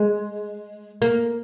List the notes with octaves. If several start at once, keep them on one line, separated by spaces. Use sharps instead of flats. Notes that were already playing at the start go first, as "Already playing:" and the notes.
Already playing: G#3
A#3